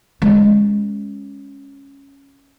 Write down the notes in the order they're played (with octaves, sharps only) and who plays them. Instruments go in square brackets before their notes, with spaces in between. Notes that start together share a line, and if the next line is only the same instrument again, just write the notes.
[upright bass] G#3 C#4